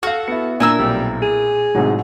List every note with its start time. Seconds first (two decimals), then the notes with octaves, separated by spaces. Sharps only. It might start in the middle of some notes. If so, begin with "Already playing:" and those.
0.03 F#4 A4 F5 F6
0.28 B3 E4 C#7
0.60 A#2 D4 E4 A#4 G#5 E6
0.79 B1 G3 C4
1.22 G#4 D#7
1.75 A1 C3 F#3 G#3 D#4